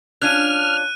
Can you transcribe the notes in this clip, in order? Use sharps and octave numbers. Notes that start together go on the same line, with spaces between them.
C#4 D4 F4 F6 F#6 D#7